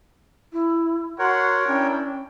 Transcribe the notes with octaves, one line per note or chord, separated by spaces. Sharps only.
E4
F#4 A#4 C#5 F#5 C6
C#4 D4 E4 G5